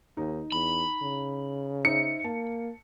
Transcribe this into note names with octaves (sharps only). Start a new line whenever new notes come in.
D#2 D#4
E2 B5
C#3
D#4 C5 E5 C#7
A#3 A5